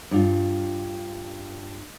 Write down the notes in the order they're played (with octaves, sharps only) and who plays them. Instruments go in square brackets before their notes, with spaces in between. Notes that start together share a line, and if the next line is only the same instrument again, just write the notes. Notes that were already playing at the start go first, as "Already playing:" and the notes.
[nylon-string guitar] G2 F4